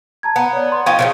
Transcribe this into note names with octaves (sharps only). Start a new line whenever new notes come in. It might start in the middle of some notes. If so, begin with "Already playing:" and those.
A5 A#5 G#6
B3 A#5
C#5 D5
C6
F3 D#4 G5 C#6 G#6
C#3 E3 F3 D7